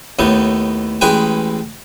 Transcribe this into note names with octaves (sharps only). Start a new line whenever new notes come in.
D#2 A2 B3 D#4
A1 G#3 G#4 B4 G5 G#5